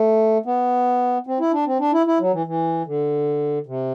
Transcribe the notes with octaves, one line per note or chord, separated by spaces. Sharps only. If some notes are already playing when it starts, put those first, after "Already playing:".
Already playing: A3
B3
C4
E4
D4
C4
D4
E4
E4
F#3
E3
E3
D3
C3